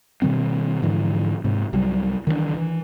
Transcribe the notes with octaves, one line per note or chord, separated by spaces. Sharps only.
B2 D#3 G3 C4
G#2 D3 E3 F3
G#2 C3
C2 F#3 G3
D#3 E3 A3 D4
E3